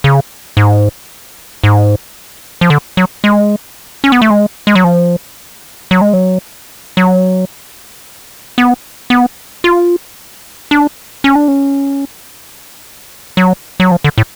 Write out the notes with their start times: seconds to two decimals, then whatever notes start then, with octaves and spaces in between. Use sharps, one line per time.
0.04 C#3
0.57 G#2
1.64 G#2
2.61 F3
2.70 D3
2.97 F#3
3.24 G#3
4.04 C#4
4.12 B3
4.22 A3
4.30 G#3
4.67 G#3
4.75 F#3
4.84 F3
5.91 F#3
6.01 G#3
6.13 F#3
6.97 F#3
8.58 B3
9.10 B3
9.64 F4
10.71 D4
11.24 C#4
11.35 D4
11.48 C#4
13.37 F#3
13.80 F#3
13.91 F3
14.04 D3
14.18 A2